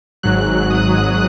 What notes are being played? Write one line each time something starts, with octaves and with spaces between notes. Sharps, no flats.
G#1 G#2 F#3 F#6
D#6